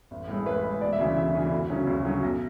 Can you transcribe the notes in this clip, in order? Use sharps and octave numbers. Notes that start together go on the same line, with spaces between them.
A1
A2 G#3
A1 B4
A2 G#3
E1 D5
E5
D2 C#3 E3
E1 E5
D2 C#3 E3
D2
C#3 F#3 C#4
D2
C#3 F#3 C#4
B1